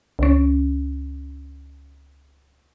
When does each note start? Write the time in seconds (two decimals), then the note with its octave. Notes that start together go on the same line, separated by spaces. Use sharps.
0.19 C#2 C#4